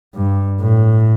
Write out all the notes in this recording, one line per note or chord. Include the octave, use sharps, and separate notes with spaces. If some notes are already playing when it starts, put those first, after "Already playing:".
G2
A2